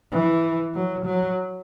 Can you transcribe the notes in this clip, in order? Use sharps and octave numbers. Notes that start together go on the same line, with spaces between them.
E3
F#3
F#3